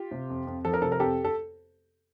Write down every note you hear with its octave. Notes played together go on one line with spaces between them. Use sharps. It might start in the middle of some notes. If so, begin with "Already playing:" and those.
Already playing: F4 G4
C3
F2
F2
F3 A4
A#4
C3 A4
A#4
F2 G4 A4
A4